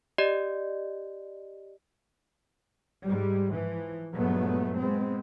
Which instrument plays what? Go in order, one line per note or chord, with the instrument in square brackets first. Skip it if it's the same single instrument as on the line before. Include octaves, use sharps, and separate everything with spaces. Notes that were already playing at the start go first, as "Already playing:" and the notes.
[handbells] G4 D5 D#5
[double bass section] G#2 G3 G#3
E3 F3
G2 A#2 F#3 G#3 A3 B3
G#3 B3 C4